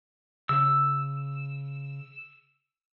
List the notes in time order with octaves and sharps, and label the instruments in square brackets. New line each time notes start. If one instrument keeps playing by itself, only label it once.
[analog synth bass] C#3 [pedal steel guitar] E6